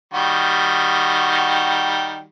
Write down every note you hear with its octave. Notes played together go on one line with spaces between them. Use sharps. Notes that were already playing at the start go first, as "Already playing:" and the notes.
D#3 G3 F#4